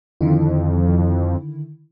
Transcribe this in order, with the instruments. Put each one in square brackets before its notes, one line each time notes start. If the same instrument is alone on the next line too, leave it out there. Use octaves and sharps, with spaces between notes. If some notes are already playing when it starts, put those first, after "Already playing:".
[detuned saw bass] F2 [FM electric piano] D3 D#3 E4